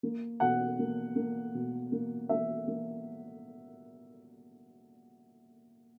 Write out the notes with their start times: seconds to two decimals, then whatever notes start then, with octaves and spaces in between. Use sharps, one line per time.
0.03 A#3
0.40 B2 F#5
0.79 A#3
1.16 A#3
1.54 B2
1.92 A#3
2.29 A#3 E5
2.68 A#3